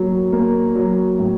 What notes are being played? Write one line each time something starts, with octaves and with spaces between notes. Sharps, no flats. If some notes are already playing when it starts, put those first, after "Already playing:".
Already playing: F#3 A#3
A#3
F#3
A2